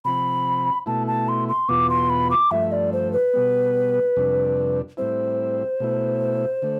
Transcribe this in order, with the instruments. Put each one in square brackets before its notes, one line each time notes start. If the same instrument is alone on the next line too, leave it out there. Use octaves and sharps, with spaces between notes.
[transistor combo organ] C3 F3 C4 [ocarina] B5
[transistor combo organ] B2 A3 E4 [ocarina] A5
[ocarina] A5
C6
C6
[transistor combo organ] E2 B2 B3 F4 [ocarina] D6
[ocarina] C6
B5
D6
[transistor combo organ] G2 F3 A3 [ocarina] E5
[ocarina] D5
C5
B4
[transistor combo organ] B2 G3 B3
F2 C3 G3 D4
[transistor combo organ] A2 G3 C4 E4 [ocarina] C5
[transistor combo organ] B2 A3 E4
D3 A3